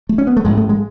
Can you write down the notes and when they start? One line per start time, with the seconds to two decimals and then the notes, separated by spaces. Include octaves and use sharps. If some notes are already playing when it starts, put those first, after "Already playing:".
0.09 A3
0.18 C#4
0.27 B3
0.37 A3
0.45 A1 G#2 G#3
0.57 A3
0.69 G#3